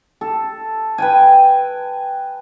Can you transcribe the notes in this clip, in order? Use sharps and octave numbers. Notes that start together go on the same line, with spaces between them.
A4
B4 G5 G#5